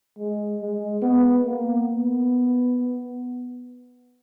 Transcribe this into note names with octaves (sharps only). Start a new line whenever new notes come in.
G#3
G#3
B3
A#3
B3